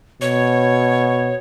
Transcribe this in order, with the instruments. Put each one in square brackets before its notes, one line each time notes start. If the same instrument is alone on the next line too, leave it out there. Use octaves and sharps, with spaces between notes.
[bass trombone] B2 [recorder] C#5